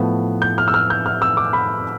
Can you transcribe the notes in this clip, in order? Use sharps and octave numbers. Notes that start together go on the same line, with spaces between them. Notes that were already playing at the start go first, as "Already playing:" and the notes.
Already playing: A2 F3 B3
G6
F6
E6
F6
G6
F6
E6
D6
B5